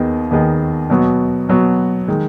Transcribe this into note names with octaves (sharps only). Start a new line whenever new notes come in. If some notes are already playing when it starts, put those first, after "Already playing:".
Already playing: D#2 D#3 B3 G#4 D#5
D#2 D#3 B3 G#4 D#5
B2 F#3 B3 F#4
B2 F#3 B3 F#4
D#3 G#3